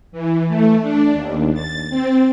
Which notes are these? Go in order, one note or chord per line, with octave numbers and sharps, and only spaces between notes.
E3
A3
D4
D#2
A6
C4